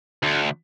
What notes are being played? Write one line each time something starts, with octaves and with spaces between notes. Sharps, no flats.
D2